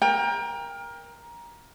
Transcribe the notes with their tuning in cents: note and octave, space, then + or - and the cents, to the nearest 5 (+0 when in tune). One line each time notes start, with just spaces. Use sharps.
A#4 +15 G5 +30